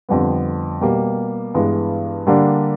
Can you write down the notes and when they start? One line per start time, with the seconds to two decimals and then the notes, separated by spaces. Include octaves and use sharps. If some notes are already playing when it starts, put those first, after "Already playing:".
0.09 F2 D3 G3 B3
0.81 B2 G3 A#3
1.54 G2 E3 G#3 B3
2.27 D3 G3 A#3 D4